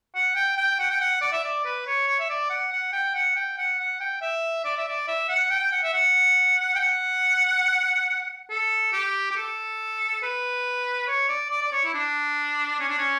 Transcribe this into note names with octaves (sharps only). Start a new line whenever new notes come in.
F#5
G5
G5
F#5
G5
F#5
D5
E5
D5
B4
C#5
C#5
E5
D5
F#5
F#5
G5
F#5
G5
F#5
F#5
G5
E5
D5
E5
D5
E5
F#5
G5
F#5
E5
F#5
G5
F#5
A4
G4
G4
A4
B4
C#5
D5
D5
D5
C#5
E4
D4
C#4
D4
C#4